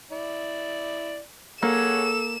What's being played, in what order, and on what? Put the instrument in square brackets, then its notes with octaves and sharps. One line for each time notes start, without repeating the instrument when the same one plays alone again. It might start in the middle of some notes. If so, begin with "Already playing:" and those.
[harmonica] E4 D5
[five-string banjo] A#3 [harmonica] G#4 C#5 F#5 [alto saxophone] A4 [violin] E7